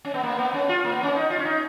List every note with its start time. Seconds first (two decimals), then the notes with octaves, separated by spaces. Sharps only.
0.05 C#4
0.14 B3
0.23 A#3
0.39 B3
0.54 C#4
0.69 F4
0.85 A#3
0.92 B3
1.03 C#4
1.15 D#4
1.30 F4
1.39 C#4
1.45 D#4